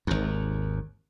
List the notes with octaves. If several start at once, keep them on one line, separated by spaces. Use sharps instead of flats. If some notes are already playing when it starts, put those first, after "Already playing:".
G#1 D#2